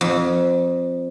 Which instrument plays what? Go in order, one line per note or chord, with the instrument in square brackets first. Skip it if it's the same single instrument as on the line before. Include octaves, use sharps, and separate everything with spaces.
[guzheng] F2